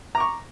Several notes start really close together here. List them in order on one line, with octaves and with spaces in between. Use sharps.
A#5 D6 C#6